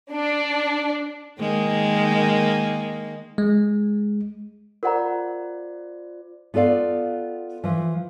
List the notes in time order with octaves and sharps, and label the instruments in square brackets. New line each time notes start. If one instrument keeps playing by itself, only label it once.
[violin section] D4
[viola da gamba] D#3 G#3 A#3
[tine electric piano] G#3
[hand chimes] F4 C5 D5 [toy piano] A#4 F#5 A#5
[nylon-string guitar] B3 F4 A4 D5 F5
E3 F3